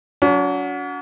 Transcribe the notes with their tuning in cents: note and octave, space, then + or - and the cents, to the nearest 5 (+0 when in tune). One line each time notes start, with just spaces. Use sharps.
F#3 -15 C#4 +45